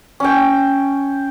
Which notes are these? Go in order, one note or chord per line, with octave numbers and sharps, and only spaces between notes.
C#4 G5